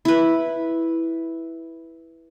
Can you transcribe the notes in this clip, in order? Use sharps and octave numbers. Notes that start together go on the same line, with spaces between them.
E4 B4